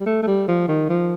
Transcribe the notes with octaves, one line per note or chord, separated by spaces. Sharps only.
G3
A3
A3
G3
F3
D#3
F3